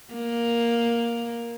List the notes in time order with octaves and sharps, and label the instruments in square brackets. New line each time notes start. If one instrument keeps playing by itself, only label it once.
[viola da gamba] A#3